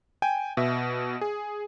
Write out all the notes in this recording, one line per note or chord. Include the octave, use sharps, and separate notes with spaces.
G5 G#5
B2 E5
G#4